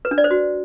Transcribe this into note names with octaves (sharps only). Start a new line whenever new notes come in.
B4
D4
D5
C5
F#4